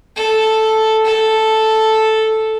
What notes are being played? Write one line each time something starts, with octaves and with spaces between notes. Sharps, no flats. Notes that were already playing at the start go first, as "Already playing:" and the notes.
A4
A4